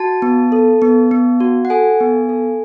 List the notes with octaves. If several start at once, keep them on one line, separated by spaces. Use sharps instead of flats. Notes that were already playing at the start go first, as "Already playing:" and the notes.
Already playing: F#4 A5
B3
A4
B3
B3
F#4
F#5
A4 G#5
B3
A4